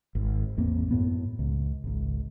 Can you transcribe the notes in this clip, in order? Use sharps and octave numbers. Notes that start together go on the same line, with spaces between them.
G#1
A1 E2 A#3 C4
F#2 A2 B3
C#2
G#1 C#2